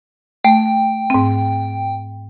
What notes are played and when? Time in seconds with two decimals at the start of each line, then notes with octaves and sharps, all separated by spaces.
0.45 A3 G5
1.10 G#2 C4